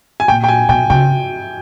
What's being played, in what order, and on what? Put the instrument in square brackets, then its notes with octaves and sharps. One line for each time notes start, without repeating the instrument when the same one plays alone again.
[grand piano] G#5
[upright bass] A#2 [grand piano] G5
[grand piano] G5
G#5
[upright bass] B2 [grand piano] G5
[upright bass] C#3 [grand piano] G5